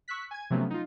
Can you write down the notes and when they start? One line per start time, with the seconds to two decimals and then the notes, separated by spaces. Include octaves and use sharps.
0.08 C#6 E6 F#6 B6
0.31 G#5 G#6
0.50 C3 F3 F#3 A3 B3 C#4
0.70 D#4 F4